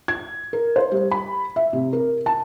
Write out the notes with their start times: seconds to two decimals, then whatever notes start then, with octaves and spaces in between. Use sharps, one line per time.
0.08 G#6
0.53 A#4
0.76 C5
0.92 G3
1.11 B5
1.56 E5
1.73 C3
1.93 A#4
2.26 A5